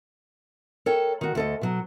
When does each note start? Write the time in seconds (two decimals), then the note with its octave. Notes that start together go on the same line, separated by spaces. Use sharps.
0.86 A4 A#4 C#5 G5
1.21 D#3 F#4
1.35 D2 A4 D#5
1.61 B2 F#3